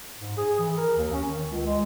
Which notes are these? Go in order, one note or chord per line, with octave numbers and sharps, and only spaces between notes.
G#2
G#4
E3
A#4
D#2
C#4
D#3
C#2
G#3